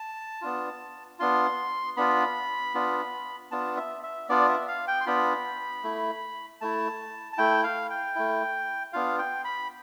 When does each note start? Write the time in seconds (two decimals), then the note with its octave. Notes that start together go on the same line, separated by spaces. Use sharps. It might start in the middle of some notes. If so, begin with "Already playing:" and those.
Already playing: A5
0.42 B3 D4 F4
1.19 B3 D4 F4 C6
1.97 B3 D4 F4 B5
2.74 B3 D4 F4
3.51 B3 D4 F4 A5
3.77 E5
4.03 E5
4.29 B3 D4 F4 D5
4.48 E5
4.68 F5
4.87 G5
5.01 C6
5.06 B3 D4 F4 B5
5.83 A3 E4
6.61 A3 E4 A5
7.33 A5
7.38 A3 E4 G5
7.64 F5
7.90 G5
8.15 A3 E4
8.93 B3 D4 F4 F5
9.18 G5
9.45 B5